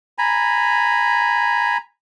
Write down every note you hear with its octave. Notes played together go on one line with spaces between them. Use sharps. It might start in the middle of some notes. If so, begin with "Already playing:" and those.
G#5 A#5 B5